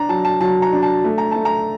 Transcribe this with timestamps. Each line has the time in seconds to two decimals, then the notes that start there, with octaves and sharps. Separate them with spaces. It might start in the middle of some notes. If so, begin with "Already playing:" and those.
Already playing: D4 A#5
0.09 F#3 A5
0.25 A5
0.40 F#3 A5
0.62 A#5
0.73 D4
0.83 A5
1.04 A3
1.18 A#5
1.31 A3 A5
1.45 A#5